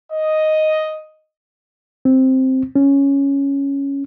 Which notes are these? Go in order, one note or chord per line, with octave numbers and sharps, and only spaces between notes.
D#5
C4
C#4